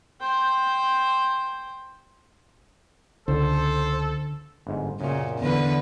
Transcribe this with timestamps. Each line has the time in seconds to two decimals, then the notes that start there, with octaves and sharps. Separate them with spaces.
0.21 C5 G5
3.28 C#2 D3 A4 C5
4.67 G1 G#2
5.01 F#2 A#2 C#3
5.39 E2 D3 B4